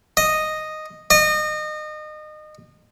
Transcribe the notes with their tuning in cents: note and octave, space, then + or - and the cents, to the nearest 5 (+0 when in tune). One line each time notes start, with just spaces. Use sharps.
D#5 -5
D#5 -30